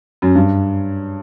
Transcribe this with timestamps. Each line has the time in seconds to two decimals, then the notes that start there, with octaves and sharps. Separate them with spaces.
0.22 F#2
0.35 G2